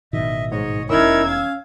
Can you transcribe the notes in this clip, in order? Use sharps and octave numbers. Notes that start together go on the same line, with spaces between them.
A1 B2 D#3 D#5 E5
G#2 C#5 D#5
F1 E2 C#4 D#4 E4 A#4 E6 G#6
F5